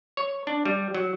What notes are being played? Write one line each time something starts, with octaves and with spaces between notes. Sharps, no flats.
C#5
D4
G3
F#3